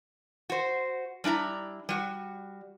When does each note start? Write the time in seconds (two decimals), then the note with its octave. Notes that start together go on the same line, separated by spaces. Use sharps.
0.50 F#4 C5
1.24 G3 D4 E4 A#5
1.89 G3 F#4